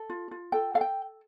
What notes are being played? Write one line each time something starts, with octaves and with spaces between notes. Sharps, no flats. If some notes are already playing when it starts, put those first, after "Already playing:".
Already playing: A4
F4
F4
A4 G5
A4 F5
G5